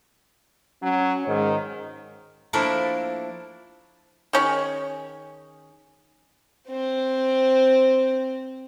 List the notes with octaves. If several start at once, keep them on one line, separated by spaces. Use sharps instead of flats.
F#3 C#4
G#2 D#3
F3 A3 A#3 D4 E4 A4
D#3 C#4 G#4
C4 C5